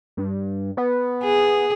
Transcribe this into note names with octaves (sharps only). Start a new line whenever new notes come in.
G2
B3
G#4